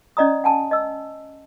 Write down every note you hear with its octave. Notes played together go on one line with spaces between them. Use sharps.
C#4 D5 D#5 A#5 D#6
F#5 G#5 A5
D#5 E6